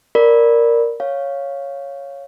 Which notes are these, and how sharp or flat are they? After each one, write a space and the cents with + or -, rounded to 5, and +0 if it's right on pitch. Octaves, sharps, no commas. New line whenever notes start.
A#4 +0 D5 +0 B5 -10
C#5 +0 F5 +0